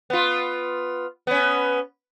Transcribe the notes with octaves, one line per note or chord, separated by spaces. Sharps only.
B3 F4
B3 C#4